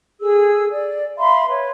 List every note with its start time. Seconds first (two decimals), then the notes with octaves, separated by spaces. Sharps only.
0.21 G#4 A4 E6
0.71 D5
1.18 E5 F5 B5 C6
1.47 B4 C#5